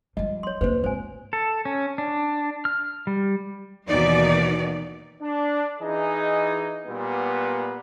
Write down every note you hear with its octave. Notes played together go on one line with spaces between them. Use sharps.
F3 G3 D#5
C#5 C6
D1 A#3 B4 C5
G#1 C5 G#5
A4
C#4
D4
F6
G3
D#2 B2 E3 D#4 D5
D4
E3 D#4 G#4 D#5
A#2 G3 B3